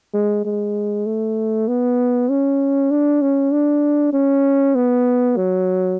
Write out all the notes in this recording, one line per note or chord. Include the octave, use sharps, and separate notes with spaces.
G#3
G#3
A3
B3
C#4
D4
C#4
D4
C#4
B3
F#3